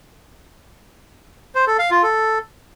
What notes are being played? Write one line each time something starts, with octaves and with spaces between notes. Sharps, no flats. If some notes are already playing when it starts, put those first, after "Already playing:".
C5
A4
F5
F4
A4